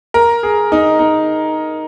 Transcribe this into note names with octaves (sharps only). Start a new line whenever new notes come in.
A#4
G#4
D#4
D#4